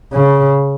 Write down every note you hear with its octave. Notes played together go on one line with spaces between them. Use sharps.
C#3